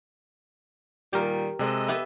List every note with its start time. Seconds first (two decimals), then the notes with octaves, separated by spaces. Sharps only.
1.13 A#2 D#3 G3 G4 A#4
1.59 C3 G#3 A4 D#5
1.88 B3 G4 B4 E5